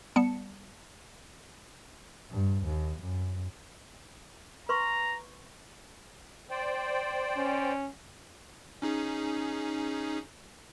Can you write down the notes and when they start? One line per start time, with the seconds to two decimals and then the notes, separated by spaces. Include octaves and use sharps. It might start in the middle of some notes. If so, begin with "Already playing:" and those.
0.16 G3 B3 A5 C#7
2.31 G2
2.65 D#2
3.02 F#2
4.69 B4 A#5 C6 C#6
6.50 C5 D5 G5
7.37 C#4
8.82 C#4 D#4 G#4